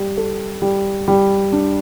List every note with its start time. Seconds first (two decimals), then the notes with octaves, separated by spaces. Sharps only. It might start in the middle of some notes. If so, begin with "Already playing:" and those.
Already playing: G3
0.18 A4
0.62 G3
1.08 G3
1.52 D4